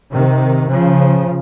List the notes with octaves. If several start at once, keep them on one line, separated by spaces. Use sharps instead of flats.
C3 D#3
C#3 F3